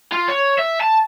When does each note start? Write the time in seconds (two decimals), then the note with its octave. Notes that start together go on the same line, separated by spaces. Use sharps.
0.12 F4
0.28 C#5
0.59 E5
0.81 A5